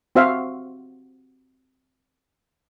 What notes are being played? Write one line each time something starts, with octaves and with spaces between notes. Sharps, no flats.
C4 F#4 C5 E5 F5